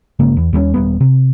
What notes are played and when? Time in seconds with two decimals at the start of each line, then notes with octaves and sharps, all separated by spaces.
0.19 G1 C#3 G#3 A#3
0.37 E2
0.53 D#2 G3 A#3 C#4
0.74 D#1 F2 G3 B3
1.01 C3